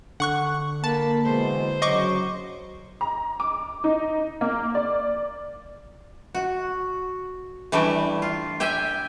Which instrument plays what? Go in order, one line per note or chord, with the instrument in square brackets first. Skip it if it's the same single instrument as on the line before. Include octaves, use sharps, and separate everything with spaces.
[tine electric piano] D3 [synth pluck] F#5 C#6 F#6
[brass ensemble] A#3 [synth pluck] A5 [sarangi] B5
[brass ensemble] B2 E3 G#3 [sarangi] C5
[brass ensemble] C#3 F#3 [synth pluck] D#5 C#6 D6
[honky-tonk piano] A#5
D6
D#4
A#3
D5
[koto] F#4
E3 G3 A3 D4
F4
G4 E5 G5 G#5